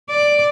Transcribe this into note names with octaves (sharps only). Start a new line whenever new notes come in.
D5